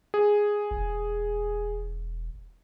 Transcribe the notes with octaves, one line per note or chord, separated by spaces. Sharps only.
G#4
E1